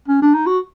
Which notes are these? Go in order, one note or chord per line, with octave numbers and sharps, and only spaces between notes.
C#4
D4
D#4
F#4